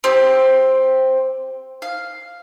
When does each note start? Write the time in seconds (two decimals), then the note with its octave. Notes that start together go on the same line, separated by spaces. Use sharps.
0.04 C4 G4
1.82 F5